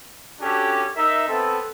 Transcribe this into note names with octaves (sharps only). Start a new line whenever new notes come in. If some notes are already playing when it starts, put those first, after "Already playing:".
C#4 D4 F#4 G4 A4
D#4 A#4 E5
B3 C4 A4